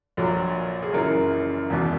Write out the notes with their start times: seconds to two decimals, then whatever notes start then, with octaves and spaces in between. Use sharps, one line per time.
0.17 A#1 A#2 F#3
0.82 G#4
0.92 F#1 F#2 E3 A#4
1.70 E1 E2 B2